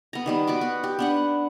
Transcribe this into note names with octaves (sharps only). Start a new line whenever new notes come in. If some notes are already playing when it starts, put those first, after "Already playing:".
B3 A#5
D#3 G3 B3
F#4 B4 D6
B3
G4
B3 D4 F#5